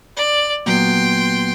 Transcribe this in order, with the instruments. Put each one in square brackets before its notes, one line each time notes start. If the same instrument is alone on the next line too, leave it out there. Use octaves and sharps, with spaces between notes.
[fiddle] D5
[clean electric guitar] A#2 F#3 B3 [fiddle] G5 C6